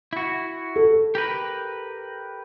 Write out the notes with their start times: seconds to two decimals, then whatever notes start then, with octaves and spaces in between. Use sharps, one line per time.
0.13 E4 F#4
0.76 A4
1.15 G4 A#4 B4